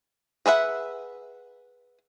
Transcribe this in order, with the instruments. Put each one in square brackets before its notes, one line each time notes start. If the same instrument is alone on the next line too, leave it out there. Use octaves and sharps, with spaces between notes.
[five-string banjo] G#4 B4 E5 F#5